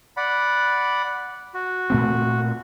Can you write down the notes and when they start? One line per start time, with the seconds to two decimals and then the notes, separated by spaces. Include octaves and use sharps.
0.17 D5 F#5 B5
1.54 F#4
1.90 A#2 A3 C4